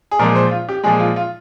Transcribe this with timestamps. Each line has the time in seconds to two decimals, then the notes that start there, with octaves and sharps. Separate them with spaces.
0.11 G#4
0.19 A#2 F3 G#3 A#4
0.35 C5
0.51 F4
0.69 G4
0.84 A#2 F3 G#3 G#4
1.00 F4
1.16 F4